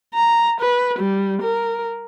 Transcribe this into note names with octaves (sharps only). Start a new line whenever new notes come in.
A#5
B4
G3
A#4